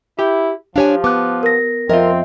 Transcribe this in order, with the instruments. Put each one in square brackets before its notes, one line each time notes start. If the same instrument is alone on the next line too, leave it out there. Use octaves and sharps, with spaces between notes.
[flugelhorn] E4 [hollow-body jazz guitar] G4 G5
[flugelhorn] F3 [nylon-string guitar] D4 C#5 G#5 [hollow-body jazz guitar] G4 F5
[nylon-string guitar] B3 [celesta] D6 F#6
[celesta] A#4 A#6
[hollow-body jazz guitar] F2 F4 [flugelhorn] C4 [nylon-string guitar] A#4 [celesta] D#5 E5